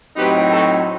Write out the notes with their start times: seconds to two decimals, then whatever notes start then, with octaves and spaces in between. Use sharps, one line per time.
0.17 A2 F#3 C4 D#4 G4 B4
0.52 F#4 A4